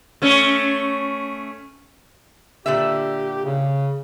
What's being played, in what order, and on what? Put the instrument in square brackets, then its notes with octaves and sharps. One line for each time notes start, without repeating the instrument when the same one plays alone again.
[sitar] A3 C#4
[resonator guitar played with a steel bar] A#2 D3 E5 [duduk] G4
[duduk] C#3